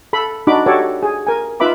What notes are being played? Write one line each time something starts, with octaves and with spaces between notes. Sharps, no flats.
A4 B5
D4 D#4 F#4 B5 D6
F#4 G4 A4 C#5 D5
G#4
A#4 G#5
D#4 F4 B4 E5 B5 D6